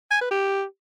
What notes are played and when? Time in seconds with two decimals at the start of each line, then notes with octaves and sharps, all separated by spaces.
0.11 G#5
0.21 B4
0.31 G4